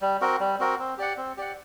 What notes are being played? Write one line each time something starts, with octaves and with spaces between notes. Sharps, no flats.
G3
C4 F#4 A#4
G3
C4 F#4 A#4
C4
G4 D5 F#5
C4
G4 D5 F#5